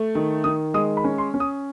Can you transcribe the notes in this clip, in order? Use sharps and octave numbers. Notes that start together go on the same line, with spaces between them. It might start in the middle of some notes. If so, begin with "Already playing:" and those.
Already playing: A3
D#3
D#3 D#6
G#3 D#6
B5
C#4
C6
C#4
D#6